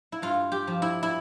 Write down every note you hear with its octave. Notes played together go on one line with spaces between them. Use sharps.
E4
G2 F4
G4
F3
E4
E4